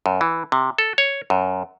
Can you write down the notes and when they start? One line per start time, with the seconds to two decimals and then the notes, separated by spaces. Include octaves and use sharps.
0.06 F#2
0.21 E3
0.52 C3
0.78 A4
0.98 C#5
1.30 F#2